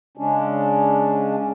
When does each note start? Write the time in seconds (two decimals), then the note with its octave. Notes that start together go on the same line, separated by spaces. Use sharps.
0.17 C#3 G#3 C#4 D4